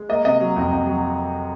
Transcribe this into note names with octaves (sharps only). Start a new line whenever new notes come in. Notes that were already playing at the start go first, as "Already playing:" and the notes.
Already playing: G#3
A#3 D#5
C3 D#5
F#3
F2
F2
F#3